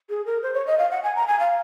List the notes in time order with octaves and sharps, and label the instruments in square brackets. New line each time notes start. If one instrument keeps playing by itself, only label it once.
[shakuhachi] G#4
A#4
C5
C#5
D#5
F5
F#5
G#5
A#5
G#5
F5